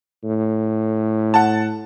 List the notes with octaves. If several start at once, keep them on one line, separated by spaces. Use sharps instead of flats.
A2
F#5 A5